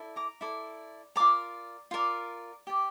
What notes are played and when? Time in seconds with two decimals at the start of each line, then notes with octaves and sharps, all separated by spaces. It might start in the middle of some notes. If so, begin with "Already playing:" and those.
Already playing: E4 A4 D5
0.16 A#5 D6
0.41 E4 A4 D5
1.16 F4 A#4 D5 A#5 D6
1.91 F4 A#4 D5
2.67 G4 D5